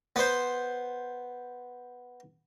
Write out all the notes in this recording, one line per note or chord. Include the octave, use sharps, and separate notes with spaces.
B3 C5